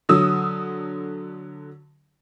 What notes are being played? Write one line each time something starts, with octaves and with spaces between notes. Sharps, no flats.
D3 F#3 D#6 E6